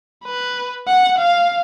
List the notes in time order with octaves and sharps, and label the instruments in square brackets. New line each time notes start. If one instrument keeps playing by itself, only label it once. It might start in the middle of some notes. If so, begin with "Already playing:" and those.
[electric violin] B4
F#5
F5